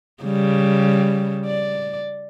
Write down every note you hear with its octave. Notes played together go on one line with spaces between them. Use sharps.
C#3 G3
D5